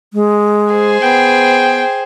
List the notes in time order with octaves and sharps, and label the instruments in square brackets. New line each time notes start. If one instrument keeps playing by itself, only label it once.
[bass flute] G#3
[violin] G#4 C5
[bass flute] B3 [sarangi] G5